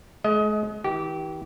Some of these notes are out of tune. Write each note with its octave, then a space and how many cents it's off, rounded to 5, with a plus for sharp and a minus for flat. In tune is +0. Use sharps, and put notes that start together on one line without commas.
G#3 +40 D#5 +25
E3 -45 G4 -20